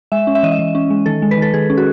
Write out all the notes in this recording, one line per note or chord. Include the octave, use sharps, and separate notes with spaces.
G#3 E5
C#4
E5
E3 D#5
E5
E3
C#4
G#3
D#3 A4
G#3
B4
D#3 A4
D#3 G#4
C#4
F#4